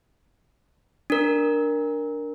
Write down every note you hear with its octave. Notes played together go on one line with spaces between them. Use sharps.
D4 A#4